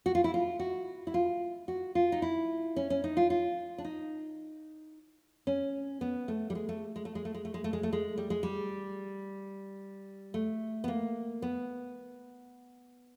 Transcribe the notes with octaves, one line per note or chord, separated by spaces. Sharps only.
F#4
F4
E4
F4
F#4
E4
F4
F#4
F4
D#4
E4
C#4
C#4
D#4
F4
F4
D4
D#4
C#4
B3
A3
G3
G#3
A3
G#3
A3
G#3
A3
G#3
A3
G#3
A3
G#3
A3
G#3
G3
G#3
G3
A3
B3
A#3
B3